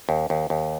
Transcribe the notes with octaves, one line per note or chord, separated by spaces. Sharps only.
D#2
D#2
D#2